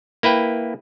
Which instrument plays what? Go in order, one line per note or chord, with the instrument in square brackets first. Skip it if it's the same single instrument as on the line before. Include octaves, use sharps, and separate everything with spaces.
[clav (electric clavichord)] A#3 E4 B4 G5